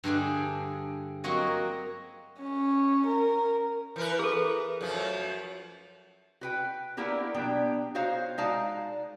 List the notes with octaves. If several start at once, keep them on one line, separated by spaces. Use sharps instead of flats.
G2 D3 D4 G#4
F#3 A#3 C4 F#4 C#5 D#5
C#4
A#4
E3 A#4 B4
G#4 A4
F#2 F3 A3
F#4 B4 G5
A#3 B3 D4 E4 G4 A#4
B2 F#3 B3 D4 G4 G5
D#4 F#4 C5 C#5 F5
G#3 D#4 F#4 D5 F5 A5